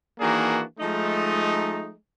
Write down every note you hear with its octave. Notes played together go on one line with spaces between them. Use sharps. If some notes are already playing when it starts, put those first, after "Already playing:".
D#3 E3 A#3 D4 F#4 G#4
F3 G#3 A3 D#4